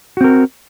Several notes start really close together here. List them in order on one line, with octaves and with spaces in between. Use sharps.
F#4 C4 A#4